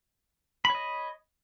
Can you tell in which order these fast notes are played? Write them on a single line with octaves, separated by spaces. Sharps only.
B5 C#5 D#5